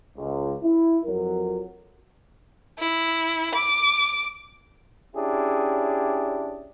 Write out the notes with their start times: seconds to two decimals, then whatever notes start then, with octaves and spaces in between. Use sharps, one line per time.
0.17 C#2
0.63 E4
1.05 F2 F#3 A#4
2.79 E4
3.55 D6
5.16 C#4 D4 E4 G4 G#4